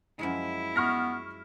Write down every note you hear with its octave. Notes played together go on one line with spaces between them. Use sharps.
F#2 F3 G#3 E4
B3 C#6 F6 A#6